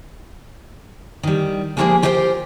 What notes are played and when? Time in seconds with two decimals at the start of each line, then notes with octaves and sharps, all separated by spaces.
1.23 D#3 G3
1.77 F3 G#3 A#3 F4 G4 G#4
2.02 F4 G4 A#4 C5 D5 G5